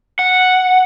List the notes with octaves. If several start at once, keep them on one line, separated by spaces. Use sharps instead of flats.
F#5